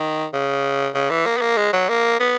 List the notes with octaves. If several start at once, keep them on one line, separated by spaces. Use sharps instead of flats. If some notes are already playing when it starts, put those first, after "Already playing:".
Already playing: D#3
C#3
C#3
E3
A#3
B3
A#3
G#3
F#3
A#3
B3